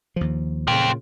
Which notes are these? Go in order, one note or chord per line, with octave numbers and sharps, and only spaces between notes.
D#2 F3
A#2 C#3 F4 G5